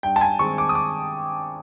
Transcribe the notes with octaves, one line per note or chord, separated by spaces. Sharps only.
G2 G5
A5
G#5
D#3 G#3 C4 C#6
D6
D#6
D6